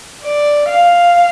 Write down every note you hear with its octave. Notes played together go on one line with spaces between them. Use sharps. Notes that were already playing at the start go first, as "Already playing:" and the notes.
D5
F5